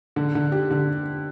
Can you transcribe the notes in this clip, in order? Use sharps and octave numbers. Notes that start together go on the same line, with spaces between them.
D3
D3
G4
D3